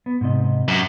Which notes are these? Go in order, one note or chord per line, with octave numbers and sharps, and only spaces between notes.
B3
G#2 C3 D#5
F#2